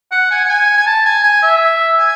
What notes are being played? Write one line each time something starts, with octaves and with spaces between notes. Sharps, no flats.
F#5
G#5
F#5
G#5
G#5
A5
G#5
G#5
E5
G#5